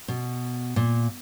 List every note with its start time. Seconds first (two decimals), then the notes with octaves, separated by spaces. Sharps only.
0.08 B2
0.76 A#2